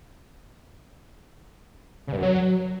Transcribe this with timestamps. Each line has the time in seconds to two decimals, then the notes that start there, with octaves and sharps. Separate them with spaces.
2.07 C#3
2.13 G2
2.18 F#2
2.23 F#3